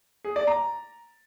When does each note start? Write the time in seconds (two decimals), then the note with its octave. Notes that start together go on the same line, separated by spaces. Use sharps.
0.24 G#4
0.36 D5
0.47 A#5